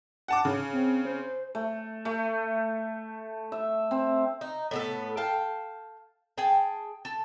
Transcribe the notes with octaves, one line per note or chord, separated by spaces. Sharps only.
F#5 A5 D6
C#3
C4
C5
A3
A3
E5
C4
D#4
A2 B3 A4
F5 G5 A5
G#4 G5 A5
A4